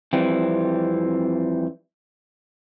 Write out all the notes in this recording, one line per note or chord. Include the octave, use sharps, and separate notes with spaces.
F2 E3 G3 C4